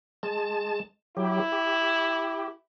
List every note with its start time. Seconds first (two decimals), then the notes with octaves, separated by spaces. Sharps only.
0.23 G#3 A5
1.17 F#3 E4 G4
1.52 G4